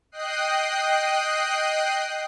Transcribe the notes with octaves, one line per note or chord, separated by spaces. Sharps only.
D#5 G5 D#6 F#6 C7